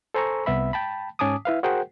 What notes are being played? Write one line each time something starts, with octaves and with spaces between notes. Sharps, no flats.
A4 C5 G#5 A#5 C#6 E6
C2 B3 E5 B5
G5 A5 B5
G#2 C#4 G#5 A5 D6 D#6
E4 B4 F5
F#4 G#4 A#4 C5 F#5 G5